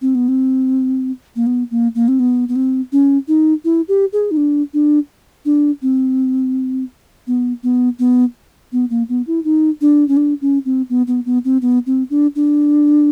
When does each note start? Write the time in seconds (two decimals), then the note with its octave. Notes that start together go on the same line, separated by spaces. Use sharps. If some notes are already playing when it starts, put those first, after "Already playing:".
0.02 C4
0.15 B3
0.28 C4
1.36 A#3
1.47 B3
1.71 A#3
1.95 A#3
2.08 C4
2.20 B3
2.49 B3
2.56 C4
2.92 C#4
3.28 D#4
3.65 E4
3.88 G4
4.13 G#4
4.31 D#4
4.37 D4
4.74 D4
5.45 D4
5.82 C4
7.27 B3
7.63 B3
7.99 B3
8.72 B3
8.90 A#3
9.09 B3
9.27 E4
9.44 D#4
9.81 D4
10.08 C#4
10.17 D4
10.41 C#4
10.65 C4
10.90 B3
11.07 B3
11.26 B3
11.45 C4
11.62 B3
11.86 C4
12.10 D4
12.36 D4